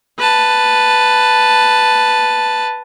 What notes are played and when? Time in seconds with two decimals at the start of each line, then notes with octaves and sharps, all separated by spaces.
0.18 B4 A5